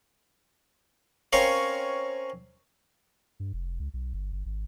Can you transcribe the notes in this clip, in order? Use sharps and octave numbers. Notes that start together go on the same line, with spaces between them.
C4 C#4 A#4 C#5 F5
G2
F1
C#2
B1
G1
G1
G#1